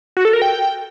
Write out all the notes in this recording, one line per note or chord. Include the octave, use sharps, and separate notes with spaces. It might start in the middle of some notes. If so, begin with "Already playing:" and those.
F#4
A4
A#4
G5